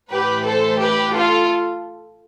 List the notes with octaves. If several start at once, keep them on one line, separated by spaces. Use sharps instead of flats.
A2 E3 G4 B4
A4 C5
G4 B4
F4 A4